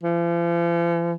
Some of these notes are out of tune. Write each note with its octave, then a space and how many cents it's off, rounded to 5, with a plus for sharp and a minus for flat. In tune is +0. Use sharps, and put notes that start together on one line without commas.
F3 -45